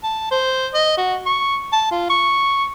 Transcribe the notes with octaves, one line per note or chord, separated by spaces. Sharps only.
A5
C5
D#5
F#4
C#6
A5
F4
C#6